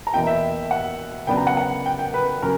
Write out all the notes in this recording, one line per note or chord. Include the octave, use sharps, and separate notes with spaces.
A#5
E2 B2 A#3 E4 G5
E5
F#5
C#3 F#3 B3 D4 G5
A#5
F#5
F#5
G5
G5
B4
C#3 F#3 C#4 A#4